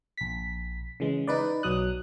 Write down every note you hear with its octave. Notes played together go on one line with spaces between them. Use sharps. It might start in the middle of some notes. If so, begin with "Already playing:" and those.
A#1 B6
C#3 E3 G#3
D#4 B4 D5
B1 F#3 D#6 F#6